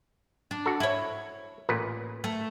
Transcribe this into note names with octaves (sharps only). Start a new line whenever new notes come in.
D4
F#4 A4
E4 C#5
A1 A#2 B4
A3